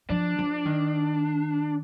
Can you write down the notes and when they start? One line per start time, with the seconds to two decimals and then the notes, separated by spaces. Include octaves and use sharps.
0.10 F3 D4
0.39 F3
0.65 D#3